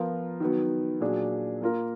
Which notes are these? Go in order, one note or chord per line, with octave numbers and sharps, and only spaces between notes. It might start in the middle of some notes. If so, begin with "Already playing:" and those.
Already playing: F3 B3 F4 A#4
D#3 F#3 B3
A#2 F#3 D4 G#4
A#3 F4 A#4